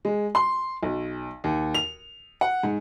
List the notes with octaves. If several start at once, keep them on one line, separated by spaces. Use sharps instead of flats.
G#3
C6
B1
D#2
F7
F#5
G#2